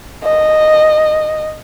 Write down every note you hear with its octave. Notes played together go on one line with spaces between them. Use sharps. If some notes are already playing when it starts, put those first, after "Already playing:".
D#5